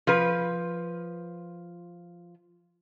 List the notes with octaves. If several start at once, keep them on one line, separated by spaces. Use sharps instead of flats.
F3 B4